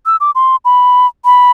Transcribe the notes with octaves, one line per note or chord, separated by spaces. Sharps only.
E6
D6
C6
B5
B5